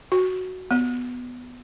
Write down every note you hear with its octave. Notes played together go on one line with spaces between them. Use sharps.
F#4
B3